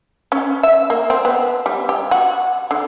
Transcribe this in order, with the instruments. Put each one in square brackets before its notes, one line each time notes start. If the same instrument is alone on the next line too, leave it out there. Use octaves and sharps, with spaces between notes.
[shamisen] C#4
E5
A#3
C4
B3
G3
G4
F#4
D3